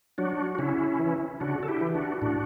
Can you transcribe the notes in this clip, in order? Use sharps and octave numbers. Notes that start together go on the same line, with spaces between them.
F#3 D4 F#4
F#4
C#3 C#4 E4
E3
C#3 D4 F#4
A4
E4 G4
E3
D4 F#4
A2 D4 F#4